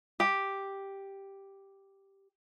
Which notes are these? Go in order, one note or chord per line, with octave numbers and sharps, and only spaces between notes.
G4